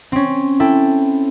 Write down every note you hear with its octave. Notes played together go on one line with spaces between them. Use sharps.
C4 C#4
E4 A4 G5